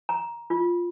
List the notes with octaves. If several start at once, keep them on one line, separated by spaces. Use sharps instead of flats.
A#5
F4